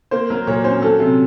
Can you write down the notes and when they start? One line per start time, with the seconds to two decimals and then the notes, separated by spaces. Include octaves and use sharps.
0.11 A#3 C5
0.30 F#3 A#4
0.47 A#2 C#5
0.64 C#4 C5
0.82 F#3 A4
1.00 C3